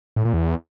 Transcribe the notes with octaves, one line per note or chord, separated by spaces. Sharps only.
A2
A#2
E2